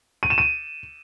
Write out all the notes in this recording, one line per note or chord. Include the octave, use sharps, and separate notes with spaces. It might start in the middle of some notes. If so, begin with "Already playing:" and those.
D#7
E7
D#7